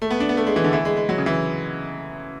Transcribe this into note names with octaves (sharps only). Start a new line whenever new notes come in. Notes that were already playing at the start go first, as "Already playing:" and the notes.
A3
B3
D4
B3
A3
G#3
E3
D3
E3
G#3
G#3
F#3
C#3
E3